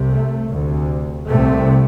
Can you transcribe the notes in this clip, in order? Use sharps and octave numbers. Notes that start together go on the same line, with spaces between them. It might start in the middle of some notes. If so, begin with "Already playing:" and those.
Already playing: C2 C3
A3
D2 C3
C2 C3 A3